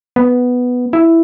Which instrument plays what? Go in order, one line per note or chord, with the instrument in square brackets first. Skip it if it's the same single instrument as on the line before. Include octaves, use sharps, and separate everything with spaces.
[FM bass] B3
E4